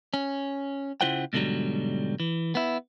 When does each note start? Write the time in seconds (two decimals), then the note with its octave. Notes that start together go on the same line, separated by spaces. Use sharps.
0.14 C#4
1.01 C#3 E4 F4 C5 F#5 G5
1.33 G#2 B2 D3 E3 F#3 G3
2.20 E3
2.55 B3 E4